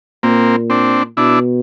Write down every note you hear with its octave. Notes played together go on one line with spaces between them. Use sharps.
A#2 A#3 C4
C4 D4
B2 D4 E4